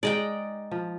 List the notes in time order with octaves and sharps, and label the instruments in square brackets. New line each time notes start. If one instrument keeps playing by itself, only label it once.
[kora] G#3 D#4 [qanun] D5 D#5 G5
[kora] F3